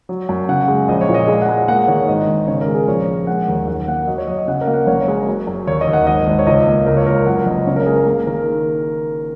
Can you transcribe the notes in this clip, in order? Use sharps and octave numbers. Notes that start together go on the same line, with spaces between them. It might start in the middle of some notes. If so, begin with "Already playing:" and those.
F#3
F#2
C#3 F#5
G#3
A#1 D#5
C#5
A#2
D#5
G#3 G#4
F#5
G#3
A#3 F#5
D#3 C#5
G#1 D#5
G#1
C#3 C#5
A#4
G#3
G#4
A#1 C#5
A#1
G#3 F#5
D#2
F#2 F#5
A#3 F#5
F#3 D#5
C#5
F#3 D#5
D#5
C#3 F#5
A#4
A#3
F#5
F#1 C#5
G#3
F#3
F#2
D#2 C#5
D#5
D#2
F#5
G#1 D#5
G#1
C#5
C#2 D#5
A#3
C#2 A#4
C#5
C#2 A#4
F#2 F#5
F#1 D#5
C#3 C#5
A#4
G#3 G#4
A#4
A#3 G#4
D#3 A#4